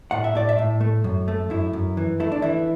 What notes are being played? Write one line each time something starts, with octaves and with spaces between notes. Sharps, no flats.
A2 F#5
E5
A2 D5
E5
A2
A3
F#2
A3
F#2 E4
F#2
E3
A3 E4
D4
E3 E4